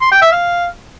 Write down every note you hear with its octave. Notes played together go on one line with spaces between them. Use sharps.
C6
G5
E5
F5